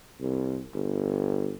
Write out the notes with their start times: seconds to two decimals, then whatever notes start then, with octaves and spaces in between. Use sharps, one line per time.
0.21 C2
0.74 G1